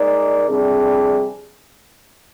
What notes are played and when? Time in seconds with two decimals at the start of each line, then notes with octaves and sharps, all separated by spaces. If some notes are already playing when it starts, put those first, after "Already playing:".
Already playing: G#3 D#4 A#4 D5
0.47 F2 C3 G3 D4 G#4